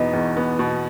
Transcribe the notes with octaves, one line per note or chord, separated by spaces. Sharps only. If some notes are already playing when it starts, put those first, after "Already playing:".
Already playing: E2 B2 B3 D#4
E2
B3
B2